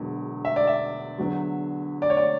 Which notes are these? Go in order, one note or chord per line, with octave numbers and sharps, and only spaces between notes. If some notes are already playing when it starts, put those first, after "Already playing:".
Already playing: E1 E2 D3 F#3
E5
D5
E5
E2 D3 F#3
D5
C#5
D5